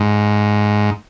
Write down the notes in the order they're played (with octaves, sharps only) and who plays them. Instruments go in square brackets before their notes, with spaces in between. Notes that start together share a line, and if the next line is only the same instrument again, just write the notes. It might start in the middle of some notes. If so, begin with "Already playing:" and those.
Already playing: [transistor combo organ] G#2